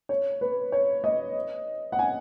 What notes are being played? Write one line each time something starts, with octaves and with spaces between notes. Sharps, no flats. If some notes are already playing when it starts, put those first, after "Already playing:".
C#5
B4
C#5
D#5
F#5
G#5